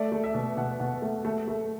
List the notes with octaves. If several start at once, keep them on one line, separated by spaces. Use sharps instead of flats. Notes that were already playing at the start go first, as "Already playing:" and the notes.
Already playing: A3 D5
A3
E5
B2
B2 F#5
B2 F#5
A3
A3
A3